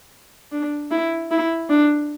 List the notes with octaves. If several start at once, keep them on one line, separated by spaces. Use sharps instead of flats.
D4
E4
E4
D4